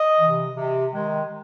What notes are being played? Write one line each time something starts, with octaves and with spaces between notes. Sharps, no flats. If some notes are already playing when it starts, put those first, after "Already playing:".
Already playing: D#5
C3 E3
C3
D#3 G#3